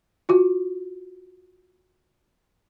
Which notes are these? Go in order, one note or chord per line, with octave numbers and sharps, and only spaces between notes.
F4 F#4